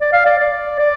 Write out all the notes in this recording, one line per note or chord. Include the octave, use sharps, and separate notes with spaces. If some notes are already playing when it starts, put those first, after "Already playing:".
D5
F5
D5
D5
D5